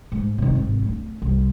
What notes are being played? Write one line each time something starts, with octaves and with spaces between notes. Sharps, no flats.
G#2
C3 D#3
G#1
D1 D3
C2